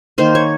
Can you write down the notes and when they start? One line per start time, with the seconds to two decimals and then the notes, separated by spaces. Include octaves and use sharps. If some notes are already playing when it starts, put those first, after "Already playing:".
0.18 D#3 A#3 C5
0.35 C#5